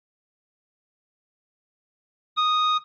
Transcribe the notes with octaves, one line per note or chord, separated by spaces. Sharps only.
D#6